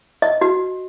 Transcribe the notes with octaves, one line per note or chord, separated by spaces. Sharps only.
D#5
F#4